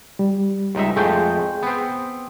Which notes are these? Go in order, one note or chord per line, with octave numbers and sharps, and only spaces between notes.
G3
C#2 G3 D#4 E5
F2 G#3 A3 G#4 G5 G6
B3 C4